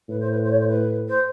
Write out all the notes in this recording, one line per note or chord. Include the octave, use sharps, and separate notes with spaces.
A2 B4
C5
B4
C5
C#5
C5
B4
C5